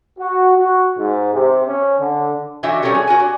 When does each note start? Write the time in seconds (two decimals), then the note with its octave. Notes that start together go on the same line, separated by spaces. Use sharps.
0.18 F#4
0.56 F#4
0.97 G#2
1.33 C3
1.66 C#4
1.99 D3
2.63 D3 E3 D4 D#4 F#4 E5
2.82 F#3 G3 C#4 G4 A4 A#4
2.95 G#4
3.07 F#4 A#4 G#5
3.20 D4